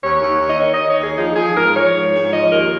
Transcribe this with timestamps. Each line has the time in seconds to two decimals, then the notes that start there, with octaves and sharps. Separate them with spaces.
0.02 D#2 C#5
0.20 D#2
0.41 D#2
0.50 D#5
0.59 D#3 C#5
0.74 D#3 D#5
0.89 C#5
0.98 D#2 G#4
1.17 F3 D#4
1.36 F3 G#4
1.55 G#2 A#4
1.75 F3 C#5
1.95 G#2
2.14 G#2
2.33 F3 D#5
2.52 D#2 A#4